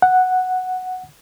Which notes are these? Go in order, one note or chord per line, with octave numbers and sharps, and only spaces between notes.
F#5